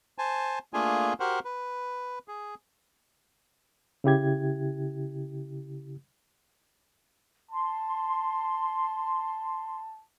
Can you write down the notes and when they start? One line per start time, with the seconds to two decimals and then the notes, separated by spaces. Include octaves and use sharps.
0.18 C5 G#5 A5
0.73 A3 A#3 D4 F4 G#4 G#5
1.20 F#4 G4 A#4 C5 F#5
1.45 B4
2.28 G#4
4.04 C#3 E4 G4 G#6
7.51 A5 C6